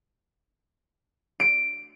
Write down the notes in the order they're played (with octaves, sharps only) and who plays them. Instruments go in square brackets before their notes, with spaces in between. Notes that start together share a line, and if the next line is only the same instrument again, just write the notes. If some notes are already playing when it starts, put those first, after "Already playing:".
[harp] D7